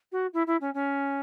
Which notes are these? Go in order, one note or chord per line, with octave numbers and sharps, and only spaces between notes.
F#4
E4
E4
C#4
C#4